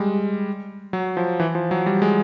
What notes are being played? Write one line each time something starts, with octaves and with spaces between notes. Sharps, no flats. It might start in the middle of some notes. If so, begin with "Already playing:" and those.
Already playing: G3 G#3
F#3
F3
E3
F3
F#3
G3
G#3